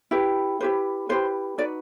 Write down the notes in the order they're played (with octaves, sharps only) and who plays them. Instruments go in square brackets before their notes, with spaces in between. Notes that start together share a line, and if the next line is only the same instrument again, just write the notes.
[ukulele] E4 G4 B4
E4 G4 B4 C5
E4 G4 B4 C5
D#4 F#4 B4 D5